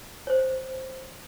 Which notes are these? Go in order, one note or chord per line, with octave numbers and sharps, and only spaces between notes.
C5 C#5